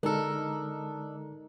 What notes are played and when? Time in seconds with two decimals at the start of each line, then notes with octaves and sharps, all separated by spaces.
0.03 D3 G#3 D4 D#4 A4 A#4